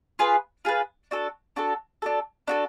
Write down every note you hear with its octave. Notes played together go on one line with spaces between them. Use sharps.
F4 G#4 B4
F4 G#4 B4
D4 F#4 A4
D4 F#4 A4
D4 F#4 A4
D4 F#4 A4